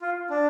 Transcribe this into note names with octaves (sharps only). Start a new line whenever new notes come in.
F4
D4